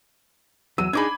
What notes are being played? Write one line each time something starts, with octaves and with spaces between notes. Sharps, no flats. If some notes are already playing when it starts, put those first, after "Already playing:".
E2 F#3 E6 D#7
D4 D#4 G#4 B5 D6 G#6